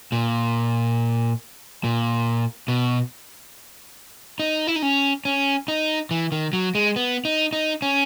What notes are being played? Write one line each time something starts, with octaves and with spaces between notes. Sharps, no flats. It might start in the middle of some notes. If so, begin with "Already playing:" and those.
A#2
A#2
B2
D#4
E4
D#4
C#4
C#4
D#4
E3
D#3
F#3
G#3
B3
D#4
D#4
C#4